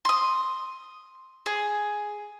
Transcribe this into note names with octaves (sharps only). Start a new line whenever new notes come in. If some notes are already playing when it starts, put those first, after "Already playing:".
C6 D#6
G#4